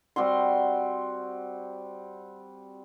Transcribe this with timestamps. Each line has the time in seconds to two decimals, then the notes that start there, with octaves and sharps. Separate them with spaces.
0.16 G3 C4 F#4 C6